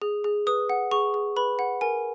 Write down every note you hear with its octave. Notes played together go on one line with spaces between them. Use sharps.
G#4
G#4
B4 D#6
F#5
G#4 C#6
G#4
B4 B5
F#5
A#4 G#5